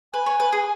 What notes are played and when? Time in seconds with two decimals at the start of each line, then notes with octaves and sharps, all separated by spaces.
0.13 B4 G#5
0.26 C#5
0.40 B4
0.53 G#4